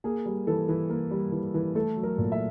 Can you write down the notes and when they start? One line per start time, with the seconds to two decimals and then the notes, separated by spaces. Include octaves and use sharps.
0.04 A#3 G#4
0.26 G3
0.47 E3 A4
0.69 E3
0.89 A#3
1.11 G3
1.32 E3
1.54 E3
1.75 A3 A4
1.96 F#3
2.03 A#4
2.18 A#2
2.32 E5